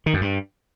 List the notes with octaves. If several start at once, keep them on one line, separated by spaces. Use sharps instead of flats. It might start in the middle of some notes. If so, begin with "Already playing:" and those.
D#3
F#2
G2